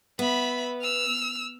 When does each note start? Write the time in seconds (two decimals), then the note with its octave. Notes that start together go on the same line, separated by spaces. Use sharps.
0.19 B3 E5 B5
0.81 E6 F6